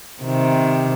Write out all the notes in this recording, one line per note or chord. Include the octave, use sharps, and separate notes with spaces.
C3 D#3